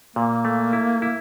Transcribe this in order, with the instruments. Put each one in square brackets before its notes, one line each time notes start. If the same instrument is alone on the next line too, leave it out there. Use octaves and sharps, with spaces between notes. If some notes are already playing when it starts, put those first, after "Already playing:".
[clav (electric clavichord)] A#2 [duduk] A#3
[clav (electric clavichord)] A3
E4
E4